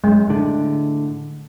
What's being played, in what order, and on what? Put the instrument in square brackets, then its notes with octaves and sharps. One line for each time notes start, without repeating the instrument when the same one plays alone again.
[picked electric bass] F#2 [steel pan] G#3
[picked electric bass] A2 D3